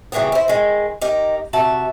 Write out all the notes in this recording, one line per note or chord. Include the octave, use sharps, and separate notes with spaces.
C#3 E3 F#3 G3 B3
E4 C5
D#3 G#3
D#4 G4 A#4
C3 F#4 E5 A5